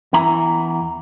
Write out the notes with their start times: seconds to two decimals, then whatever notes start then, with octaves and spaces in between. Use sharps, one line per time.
0.13 E2 E3 E4 A#5